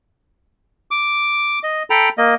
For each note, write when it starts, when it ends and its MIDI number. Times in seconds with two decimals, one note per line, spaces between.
0.91 1.59 86
1.63 1.83 75
1.90 2.09 69
1.90 2.09 79
1.90 2.09 82
1.90 2.09 83
2.18 2.35 58
2.18 2.35 75